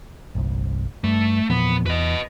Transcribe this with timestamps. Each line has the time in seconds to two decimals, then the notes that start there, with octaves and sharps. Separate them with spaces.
0.35 G1 C2
1.04 G2 A3
1.50 E2 A#2 F3 B3
1.86 E2 B4 D#5